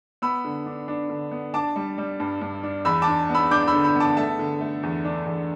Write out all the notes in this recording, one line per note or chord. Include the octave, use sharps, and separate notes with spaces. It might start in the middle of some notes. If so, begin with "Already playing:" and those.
B3 B5 E6
D3
D4
D4
D3
B3
D4 A5 D6
G3
G3
G2
G2
D4
E2 B5 E6
A5 D6
D4
B3
B5 E6
D4 D6 G6
B5 E6
D3
B5 E6
B3
A5 D6
A3 E5 A5
D3
A3
E2
D4
E2